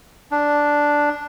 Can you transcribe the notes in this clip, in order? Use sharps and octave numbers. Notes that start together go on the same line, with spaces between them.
D4